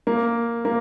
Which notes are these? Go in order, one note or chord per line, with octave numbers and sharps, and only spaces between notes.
A#3
A#3